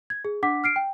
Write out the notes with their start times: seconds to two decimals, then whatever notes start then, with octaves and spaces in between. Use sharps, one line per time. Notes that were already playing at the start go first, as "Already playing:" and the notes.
0.10 G#6
0.25 G#4
0.43 D4 F#5 D6 B6
0.64 F6 C7 D7
0.76 G5